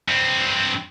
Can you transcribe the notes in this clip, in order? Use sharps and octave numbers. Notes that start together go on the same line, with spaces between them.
G2 C4